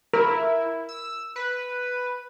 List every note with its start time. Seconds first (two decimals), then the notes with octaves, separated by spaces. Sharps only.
0.13 E4 A#4
0.89 E6
1.36 B4